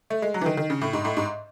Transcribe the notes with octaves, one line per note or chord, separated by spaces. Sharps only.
A3
G#3
F#3
E3
D#3
D#3
C#3
A2
G#2
A2
G#2